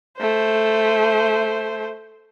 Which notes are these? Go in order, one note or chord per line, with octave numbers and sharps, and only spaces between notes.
A3 C5